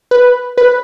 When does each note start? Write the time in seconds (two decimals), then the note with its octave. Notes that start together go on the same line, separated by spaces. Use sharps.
0.11 B4
0.58 B4